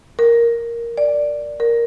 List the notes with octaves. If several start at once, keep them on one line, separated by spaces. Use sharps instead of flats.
A#4
D5
A#4